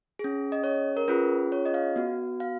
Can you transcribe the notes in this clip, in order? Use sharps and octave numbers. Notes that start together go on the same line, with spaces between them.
C#4 G#4
D#5
C#5
A#4
C#4 F4 G#4 B4
C#5
D#5
F5
B3 F#4
F5